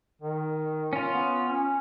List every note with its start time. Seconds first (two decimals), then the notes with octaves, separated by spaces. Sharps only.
0.21 D#3
0.93 C#4 F4
1.12 B3
1.47 C#4